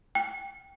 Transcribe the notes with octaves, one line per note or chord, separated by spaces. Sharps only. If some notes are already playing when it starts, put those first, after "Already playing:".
G5